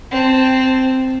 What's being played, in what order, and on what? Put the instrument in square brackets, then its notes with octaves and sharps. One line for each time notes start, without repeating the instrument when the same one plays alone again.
[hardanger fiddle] C4 A5